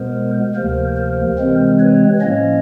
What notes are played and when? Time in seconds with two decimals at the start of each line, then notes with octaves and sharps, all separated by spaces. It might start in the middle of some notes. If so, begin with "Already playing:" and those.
Already playing: B2 G#3 B3 A#4 C5
0.55 D2 C3 F3 A#3 A#4 C5
0.96 A#4 C5
1.39 C3 E3 G#3 C4
1.80 B4 C#5
2.21 A2 F3 A#3 C#4 C#5 D#5